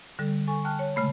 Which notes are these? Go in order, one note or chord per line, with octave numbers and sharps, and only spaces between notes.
D3 G3 A4
A4 G#5 C#6
G5 A5 F6 F#6
C#5
A#2 C#3 G#3 A3 C#5 B5